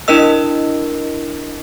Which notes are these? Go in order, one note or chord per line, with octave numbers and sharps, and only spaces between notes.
D4 E4 A#4 D#5 E6